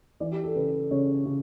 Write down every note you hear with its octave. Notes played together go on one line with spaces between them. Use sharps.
E3 D5
G4
A4
C#3 B4
C#3 C#5
C#3